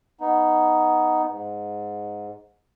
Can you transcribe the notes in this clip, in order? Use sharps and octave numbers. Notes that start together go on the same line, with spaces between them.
B3 D#4
G#2